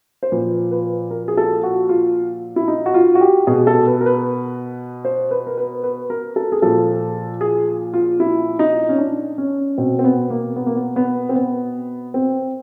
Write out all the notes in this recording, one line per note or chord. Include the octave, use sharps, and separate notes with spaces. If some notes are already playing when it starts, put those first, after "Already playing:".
C5
A#2 F3 B4
B4
A#4
G#4
A4
F#4
F4
E4
D#4
F#4
F4
F#4
G4
B2 G#4
A4
B4
A#4
B4
C5
B4
A#4
B4
B4
A#4
A4
G#4
A#2 F3 A4
G#4
F4
E4
D#4
C#4
D4
C#4
B2 C4
C4
B3
A#3
B3
A#3
B3
B3
C4
B3
C4